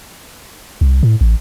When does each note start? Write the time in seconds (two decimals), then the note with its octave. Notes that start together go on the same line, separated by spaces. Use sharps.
0.81 C2
1.03 A2
1.21 A1